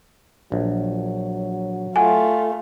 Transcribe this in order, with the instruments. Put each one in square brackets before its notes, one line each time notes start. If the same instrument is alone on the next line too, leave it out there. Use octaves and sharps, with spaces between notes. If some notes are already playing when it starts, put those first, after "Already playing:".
[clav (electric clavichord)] A#1 [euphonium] F#3
[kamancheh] A3 F4 [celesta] F#5 G#5